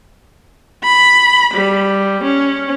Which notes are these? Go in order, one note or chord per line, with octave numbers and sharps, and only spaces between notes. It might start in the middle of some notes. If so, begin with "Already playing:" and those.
B5
G3
C#4